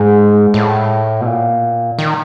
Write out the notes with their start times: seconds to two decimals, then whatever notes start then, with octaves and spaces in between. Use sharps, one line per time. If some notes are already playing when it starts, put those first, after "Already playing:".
Already playing: G#2 G#3
0.54 A2
1.21 B2
1.26 A#2
1.99 D#3